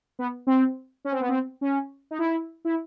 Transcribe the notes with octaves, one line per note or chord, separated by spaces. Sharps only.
B3
C4
C#4
C4
B3
C4
C#4
D#4
E4
E4